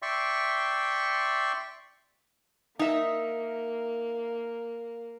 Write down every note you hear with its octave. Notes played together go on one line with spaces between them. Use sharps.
D5 E5 G5 C6 C#6
A#3 D#4 E5